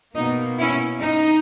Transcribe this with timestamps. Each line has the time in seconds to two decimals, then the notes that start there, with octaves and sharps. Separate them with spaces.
0.15 B2 A#3 D#4
0.58 C#4 E4
1.01 D#4